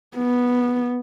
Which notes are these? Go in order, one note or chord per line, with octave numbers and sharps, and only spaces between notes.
B3